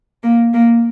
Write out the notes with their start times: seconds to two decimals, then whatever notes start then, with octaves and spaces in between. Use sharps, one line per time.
0.23 A#3
0.54 A#3